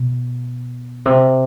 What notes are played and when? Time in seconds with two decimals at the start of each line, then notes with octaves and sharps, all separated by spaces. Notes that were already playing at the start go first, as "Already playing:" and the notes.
Already playing: B2
1.06 C3